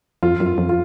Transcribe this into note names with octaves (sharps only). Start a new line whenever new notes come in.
F2 F4
F#2
F4
F2
F4